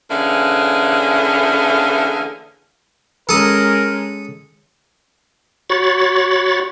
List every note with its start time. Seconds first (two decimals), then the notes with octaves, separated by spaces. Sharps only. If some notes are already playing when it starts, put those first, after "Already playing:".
0.11 D3 E3 A#3 C#4 G#4
3.29 G#3 C#4 A4 A#4 D#6
5.70 F#4 C#5 B5 A6